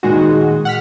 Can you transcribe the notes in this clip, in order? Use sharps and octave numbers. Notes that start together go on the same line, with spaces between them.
A#2 D#3 G#3 D#4 F#4
F#5 F6 B6